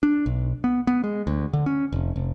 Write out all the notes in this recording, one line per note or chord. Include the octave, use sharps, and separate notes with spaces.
D4
B1
B3
B3
G#3
D2
D3
C#4
F1
F1